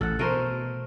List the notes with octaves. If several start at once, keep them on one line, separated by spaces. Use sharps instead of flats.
A1 A4 F#5
B2 A3 A#4 C5